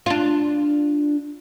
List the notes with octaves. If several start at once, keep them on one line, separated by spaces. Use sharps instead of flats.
D4 F4